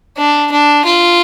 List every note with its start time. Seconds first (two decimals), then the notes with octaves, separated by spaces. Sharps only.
0.18 D4
0.52 D4
0.85 F4